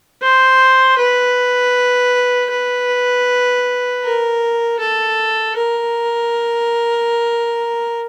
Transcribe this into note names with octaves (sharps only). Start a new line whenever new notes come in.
C5
B4
B4
A#4
A4
A#4